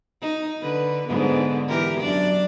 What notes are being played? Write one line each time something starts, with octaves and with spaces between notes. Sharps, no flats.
D#4
D3 B4
G#2 D3 B3
E3 G4 A#4
F#2 D4 D5